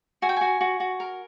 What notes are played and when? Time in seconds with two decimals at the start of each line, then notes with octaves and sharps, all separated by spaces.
0.22 F#4 G#5
0.29 G5
0.37 F#4 G#5
0.61 F#4
0.80 F#4
1.00 A#4